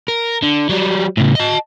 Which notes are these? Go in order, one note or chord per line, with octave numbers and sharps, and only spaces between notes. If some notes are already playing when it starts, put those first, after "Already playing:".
A#4
D3
F#3 G3
A2 C#3
D#5 A5